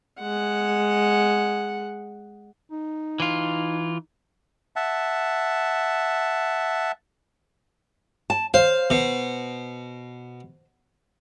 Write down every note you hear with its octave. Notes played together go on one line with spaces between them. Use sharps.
G#3 F#5
D#4
E3 F4
E5 F#5 A5
A5
C5 F5
B2